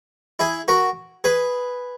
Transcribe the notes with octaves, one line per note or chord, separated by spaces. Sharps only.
E4 G#4
F#4 A#4
G#4 B4